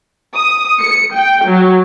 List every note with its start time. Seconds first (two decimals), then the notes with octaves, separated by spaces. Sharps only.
0.37 D#6
0.80 C#7
1.15 G5
1.47 F#3